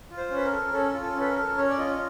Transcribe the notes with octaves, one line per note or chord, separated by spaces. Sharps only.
F4
C5
C#4
B4
A#4
A4
C#4 A4
F4
A4
C#4 B4
A#4
A4
C#4 C#5
D5
F4 D#5